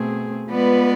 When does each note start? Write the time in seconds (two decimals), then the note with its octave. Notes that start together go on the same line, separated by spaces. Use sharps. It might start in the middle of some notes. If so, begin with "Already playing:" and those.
Already playing: B2 A3 C4 G#4
0.49 G#3 B3 F4 B4 D5